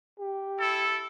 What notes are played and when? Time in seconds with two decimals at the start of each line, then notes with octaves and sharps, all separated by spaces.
0.19 G4
0.59 E4 A4